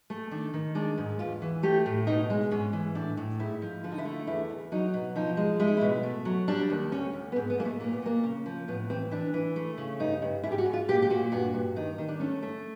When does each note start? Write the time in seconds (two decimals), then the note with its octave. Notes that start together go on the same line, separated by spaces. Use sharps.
0.10 A3
0.31 D#3 D4
0.54 D#3
0.75 G#3 D4
0.98 G#2
1.19 E2 F4
1.42 E3
1.63 A3 G4
1.86 A2
2.07 B2 D#4
2.30 G#3
2.51 G#2 C#4
2.73 E3
2.95 A2 D4
3.17 A2
3.39 G#2 E4
3.62 F3
3.84 D3 F4
3.92 D#4
3.98 E4
4.05 A3
4.14 F4
4.27 E2 E4
4.50 E2
4.72 F#3 D#4
4.94 B2
5.16 F3 D#4
5.37 G#3
5.60 G#3 E4
5.68 D#4
5.77 E4
5.81 B2
6.03 A3
6.25 F#3
6.48 G3 D4
6.70 D#2
6.92 D2 C#4
7.13 D2
7.32 B3
7.36 G#2 C4
7.50 B3
7.58 G#2 A#3
7.65 A3
7.80 A#2 A#3
7.93 B3
8.02 A#2 A#3
8.23 C#3
8.46 F3
8.68 A2 B3
8.90 E3 C4
9.11 E3 D4
9.34 E3
9.56 A3
9.78 C#3
9.99 G2 D#4
10.22 G2
10.43 G#2 E4
10.51 G4
10.58 F#4
10.66 G#2
10.73 F4
10.88 A#2 G4
11.02 G4
11.10 A#2 F#4
11.32 G2 F#4
11.54 G2
11.76 D#3 D#4
11.98 D#3
12.08 D4
12.20 A3 C#4
12.42 A3